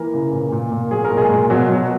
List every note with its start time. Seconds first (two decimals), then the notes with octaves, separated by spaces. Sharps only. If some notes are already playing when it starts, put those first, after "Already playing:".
Already playing: E3 A#3 A#4
0.14 C#3
0.33 A#2
0.52 A#2
0.72 A#2
0.91 F#3 G#4
1.05 A#4
1.11 A#2
1.17 G#3 G#4
1.30 A#2
1.50 B2 F#3 F#4
1.70 F#3